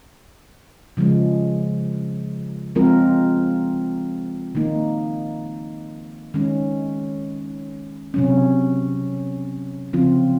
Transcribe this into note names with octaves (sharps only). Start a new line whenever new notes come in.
C#3 F3 G#3
F3 G#3 C4 F4 A#4
D#3 A#3 D#4
D#3 G#3 C#4
C3 F#3 C#4
C#3 F3 C4 F4